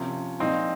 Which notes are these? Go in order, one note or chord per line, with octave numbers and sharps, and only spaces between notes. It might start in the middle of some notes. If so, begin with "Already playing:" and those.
Already playing: C3 F3 A#3 C#4
A#2 F3 C4 D#4